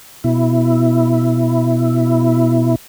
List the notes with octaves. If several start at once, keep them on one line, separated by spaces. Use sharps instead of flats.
B2 E4